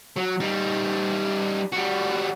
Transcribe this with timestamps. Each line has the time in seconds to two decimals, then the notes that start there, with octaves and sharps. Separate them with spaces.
0.17 F#3
0.40 G3 D#4
1.72 G3 F#4